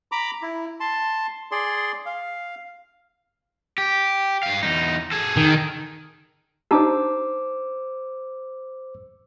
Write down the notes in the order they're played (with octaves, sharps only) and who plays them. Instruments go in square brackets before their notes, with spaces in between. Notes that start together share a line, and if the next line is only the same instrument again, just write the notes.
[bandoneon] A#5 B5 D6
E4
A5 C6
G#4 D5 C6
F5
[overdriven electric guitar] G4
G2 F5
E2 D#4
G#4 A4
[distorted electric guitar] D#3
[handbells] D4 D#4 G4 [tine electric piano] C5 D6 E6